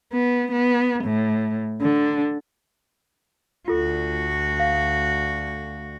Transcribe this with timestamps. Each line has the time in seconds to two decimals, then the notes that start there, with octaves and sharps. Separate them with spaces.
0.13 B3
0.52 B3
1.05 A2
1.82 D3
3.68 D2 F4 F#4 A4
4.60 F5